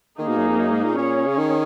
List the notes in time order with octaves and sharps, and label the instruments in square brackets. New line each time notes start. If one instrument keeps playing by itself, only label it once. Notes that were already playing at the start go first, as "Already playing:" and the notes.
[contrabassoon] D#3 [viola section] A#3 D#4 G#4
[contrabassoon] B2
F#2
F2
F#2
G#2
A#2
[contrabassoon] A#2 [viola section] C#4 G#4 C#5
[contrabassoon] C#3
D#3